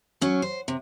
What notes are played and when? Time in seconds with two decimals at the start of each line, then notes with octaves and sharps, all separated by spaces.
0.21 F#3 C#4
0.42 C5
0.68 C3